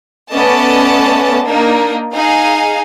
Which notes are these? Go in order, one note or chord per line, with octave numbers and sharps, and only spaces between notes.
A3 B3 C#4 D5 D#5 A5
A#3 D4 D#4 A#4
D#4 G#4 F5 G#5